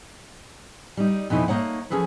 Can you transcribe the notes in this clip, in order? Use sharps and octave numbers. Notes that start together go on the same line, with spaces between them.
G3 D#4
F2 B2 E3 D#4 E4
A3 A#3 D#4 C#5 F#5
F3 F#3 C#4 G#4 A4 B4